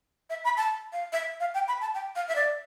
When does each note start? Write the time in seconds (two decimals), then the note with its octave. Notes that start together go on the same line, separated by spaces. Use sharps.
0.30 E5
0.44 B5
0.57 A5
0.92 F5
1.12 E5
1.40 F5
1.54 G5
1.68 B5
1.81 A5
1.94 G5
2.15 F5
2.28 E5
2.35 D5